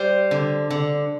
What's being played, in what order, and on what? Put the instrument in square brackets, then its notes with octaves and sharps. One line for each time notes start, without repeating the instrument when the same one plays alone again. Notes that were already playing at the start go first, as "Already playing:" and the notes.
Already playing: [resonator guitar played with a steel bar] G3 C5
D3
D3